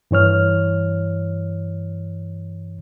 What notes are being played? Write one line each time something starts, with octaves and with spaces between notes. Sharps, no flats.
G2 E3 C#5 F6